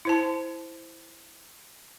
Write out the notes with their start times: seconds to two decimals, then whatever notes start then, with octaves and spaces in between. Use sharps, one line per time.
0.05 E4 C5 A5